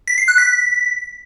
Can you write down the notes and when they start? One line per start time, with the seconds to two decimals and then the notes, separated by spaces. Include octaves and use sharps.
0.08 B6
0.18 C7
0.28 F#6
0.38 B6